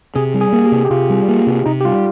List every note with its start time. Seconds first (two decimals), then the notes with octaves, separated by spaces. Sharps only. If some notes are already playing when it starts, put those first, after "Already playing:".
0.15 C3 G#4
0.34 G3
0.41 G#4
0.53 A#3
0.65 G4
0.72 C3
0.85 G4
0.90 C3 F4
1.10 G3
1.28 A#3
1.47 C3
1.66 C3 D#4
1.81 G4
1.85 G3 F4